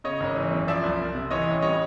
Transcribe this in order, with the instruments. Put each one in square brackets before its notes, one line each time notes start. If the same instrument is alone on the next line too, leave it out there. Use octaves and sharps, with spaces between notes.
[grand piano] C#3 C#5 D#5
G#1
E3
F#2
F3 D5 E5
C2
C2
C3
E3 C#5 D#5
A1
G3 C#5 D#5